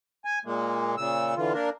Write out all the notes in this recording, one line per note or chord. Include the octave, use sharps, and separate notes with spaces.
G#5
A#2 G#3 A#3
A#2 C#3 E6
D3 E3 F4
A#3 D4 A#4